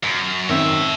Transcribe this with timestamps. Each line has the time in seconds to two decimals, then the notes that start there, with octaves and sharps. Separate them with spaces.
0.03 F#2
0.49 F#2 D#3 C4 C#5 E5